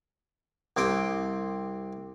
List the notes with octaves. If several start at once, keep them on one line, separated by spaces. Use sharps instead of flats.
C2 C4 G4 G5